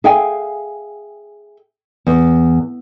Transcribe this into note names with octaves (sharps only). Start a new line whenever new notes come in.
G#4 E5 F5 G5 G#5
E2